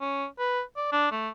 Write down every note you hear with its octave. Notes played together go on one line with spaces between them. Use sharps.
C#4
B4
D5
D4
A3